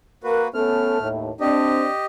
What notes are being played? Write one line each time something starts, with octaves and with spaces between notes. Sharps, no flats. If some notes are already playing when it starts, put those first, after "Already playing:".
A#3 F#4 A#4 B4
A3 B3 C#4 A4 F6
D#2 A2
C4 D4 G4 D#5